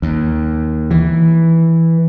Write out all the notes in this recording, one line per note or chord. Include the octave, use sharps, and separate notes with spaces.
D#2
E3